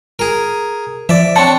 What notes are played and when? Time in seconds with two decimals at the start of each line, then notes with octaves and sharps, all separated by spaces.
0.19 G#4 A#4
1.09 F3 D5 E5
1.36 C4 D4 C#5 F#5 A5